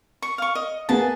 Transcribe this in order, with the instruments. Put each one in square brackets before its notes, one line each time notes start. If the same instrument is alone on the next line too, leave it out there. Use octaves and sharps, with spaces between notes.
[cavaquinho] C#6
F5 C#6
D#5
[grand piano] A#3 B3 G#4 [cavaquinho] A5